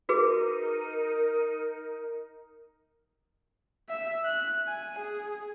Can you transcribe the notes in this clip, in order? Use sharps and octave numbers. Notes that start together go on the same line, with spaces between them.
D#4 F#4 G#4 A#4 B4
E5
F#6
G#5
G#4